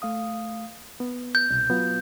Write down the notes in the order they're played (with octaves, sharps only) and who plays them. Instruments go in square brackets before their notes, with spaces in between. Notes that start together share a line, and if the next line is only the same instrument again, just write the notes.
[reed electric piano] A3 F5 D#6
B3
[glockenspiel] G6
[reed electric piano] C2 B2
F#3 B3 F4